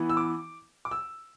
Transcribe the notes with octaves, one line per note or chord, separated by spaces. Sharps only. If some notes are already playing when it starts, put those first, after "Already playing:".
Already playing: E3 B3 E4
E6
D6
D6
E6